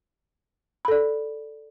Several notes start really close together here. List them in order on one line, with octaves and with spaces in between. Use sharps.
B5 A4 D5